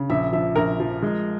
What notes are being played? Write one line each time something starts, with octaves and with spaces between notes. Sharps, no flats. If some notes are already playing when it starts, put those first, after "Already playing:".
Already playing: C#3
A#1 E5
F3 E5
A#1 A#4
F3
G#3